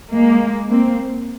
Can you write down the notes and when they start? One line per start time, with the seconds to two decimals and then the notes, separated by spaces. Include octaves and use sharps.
0.13 G#3 A#3
0.70 A#3 C4